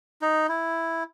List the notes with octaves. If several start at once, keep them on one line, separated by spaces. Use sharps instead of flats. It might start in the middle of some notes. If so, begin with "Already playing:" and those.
D#4
E4